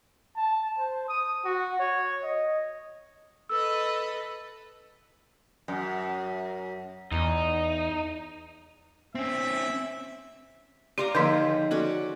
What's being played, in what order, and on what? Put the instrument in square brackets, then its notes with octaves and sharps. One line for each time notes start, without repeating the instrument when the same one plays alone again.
[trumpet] A5
C5
D#6
F#4
C#5
D#5
[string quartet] A4 B4 D#5 [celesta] E6
[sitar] F#2
[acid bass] E2 [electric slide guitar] D#4
[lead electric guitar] C4 C#4 [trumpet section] E5
[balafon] G4 C6 [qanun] D5 F5 A#5
[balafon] D3 F3 A#3 [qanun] D#3 G#4 A4
[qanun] C#4 F#4 D5 [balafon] A4